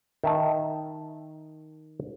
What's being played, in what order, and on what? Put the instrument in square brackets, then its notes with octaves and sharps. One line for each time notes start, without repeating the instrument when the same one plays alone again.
[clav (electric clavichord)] D#3 E5 A5